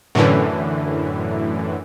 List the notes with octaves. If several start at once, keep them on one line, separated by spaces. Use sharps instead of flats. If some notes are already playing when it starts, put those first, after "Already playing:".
F#2 A2 D3 E3